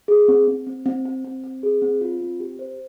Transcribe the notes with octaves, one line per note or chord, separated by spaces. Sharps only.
G#4
C4
C4
C4
C4
C4
C4
C4
G#4
C4
F4
C4
G4
C5